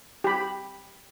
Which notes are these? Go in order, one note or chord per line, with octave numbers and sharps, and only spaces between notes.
G4 B5